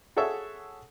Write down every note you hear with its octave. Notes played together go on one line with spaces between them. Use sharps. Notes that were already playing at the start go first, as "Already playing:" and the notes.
F#4 G#4 A4 C#5 E5 C#6